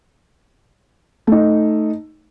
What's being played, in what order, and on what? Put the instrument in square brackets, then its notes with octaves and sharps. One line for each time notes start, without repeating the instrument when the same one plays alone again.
[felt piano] A3 D#4